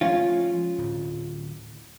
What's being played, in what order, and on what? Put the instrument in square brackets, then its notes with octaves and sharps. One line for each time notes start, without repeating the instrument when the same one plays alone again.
[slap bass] F3 G#3 A3 [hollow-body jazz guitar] C#4 F4
[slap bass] D1